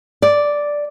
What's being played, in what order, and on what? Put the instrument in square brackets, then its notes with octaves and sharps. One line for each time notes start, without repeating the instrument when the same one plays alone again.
[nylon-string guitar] D5